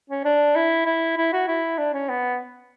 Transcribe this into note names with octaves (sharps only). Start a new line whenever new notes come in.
C#4
D4
E4
E4
E4
F#4
E4
D4
C#4
B3